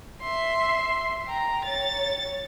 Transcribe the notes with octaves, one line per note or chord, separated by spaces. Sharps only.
E5 C6
G5 A#5
C#5 A6